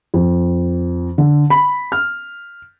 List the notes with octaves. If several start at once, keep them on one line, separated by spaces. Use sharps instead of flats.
F2
D3
B5
F6